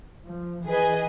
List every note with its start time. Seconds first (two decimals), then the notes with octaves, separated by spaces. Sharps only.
0.24 F3
0.67 E3 G#4 B4 D#5 G#5